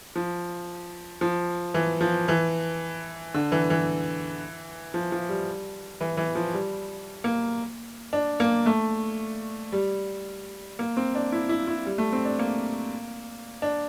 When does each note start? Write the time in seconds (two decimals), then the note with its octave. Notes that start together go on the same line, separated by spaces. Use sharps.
0.16 F3
1.21 F3
1.74 E3
2.01 F3
2.28 E3
3.34 D3
3.52 E3
3.70 E3
4.94 F3
5.12 F3
5.29 G3
6.01 E3
6.17 E3
6.35 F3
6.53 G3
7.24 A#3
8.13 D4
8.40 A#3
8.66 A3
9.72 G3
10.79 A#3
10.97 C4
11.15 D4
11.32 E4
11.49 E4
11.67 E4
11.86 G3
11.98 A3
12.13 C4
12.25 D4
12.39 A#3
13.62 D4